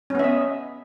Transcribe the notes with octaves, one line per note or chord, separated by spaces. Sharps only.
B3 C#4 D#5 E5